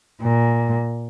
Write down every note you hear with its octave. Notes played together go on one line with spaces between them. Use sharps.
A#2